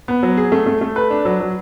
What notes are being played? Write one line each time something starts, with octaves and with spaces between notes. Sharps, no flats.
B3
F#3
G#4
A3
A3
A3
B4
D4
F#3
F#3